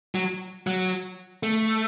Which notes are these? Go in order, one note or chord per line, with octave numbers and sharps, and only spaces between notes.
F#3
F#3
A3